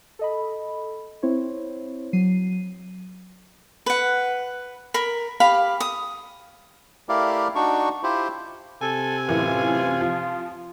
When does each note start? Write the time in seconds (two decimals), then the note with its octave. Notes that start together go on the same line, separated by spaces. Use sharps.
0.19 A4 D#5 B5
1.22 C4 E4 C5 C#5
2.13 F#3 C7 D#7
3.86 B4 F#5
4.94 A#4 B5
5.40 G4 F5 B5
5.80 D#6
7.09 A3 E4 G4 A#4 D5 F5
7.55 D4 D#4 F#4 C#6
8.03 E4 F4 G4 C5
8.82 C3 A4 G#5
9.29 F#2 A2 E3 F4
10.01 F3